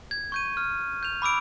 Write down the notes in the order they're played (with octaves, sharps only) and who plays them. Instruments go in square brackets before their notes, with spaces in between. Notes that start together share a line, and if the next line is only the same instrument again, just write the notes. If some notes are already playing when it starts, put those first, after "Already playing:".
[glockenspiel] G#6
C#6 G6 D#7
F6
G6 F7
B5 D6 E6 D7